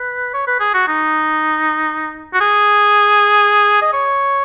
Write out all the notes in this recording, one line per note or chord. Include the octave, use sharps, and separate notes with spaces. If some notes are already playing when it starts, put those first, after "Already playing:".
Already playing: B4
C#5
B4
G#4
F#4
D#4
F#4
G#4
D#5
C#5